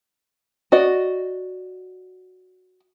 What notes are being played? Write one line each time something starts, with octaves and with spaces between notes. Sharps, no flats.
F#4 D5 D#5